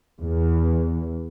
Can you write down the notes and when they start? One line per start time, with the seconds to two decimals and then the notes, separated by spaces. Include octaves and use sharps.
0.20 E2